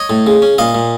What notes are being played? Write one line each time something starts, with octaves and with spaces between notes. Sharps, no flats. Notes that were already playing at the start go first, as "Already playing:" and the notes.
Already playing: C#5 D#5
A2
C#3
C#4
A#2 D#5 F5
A#2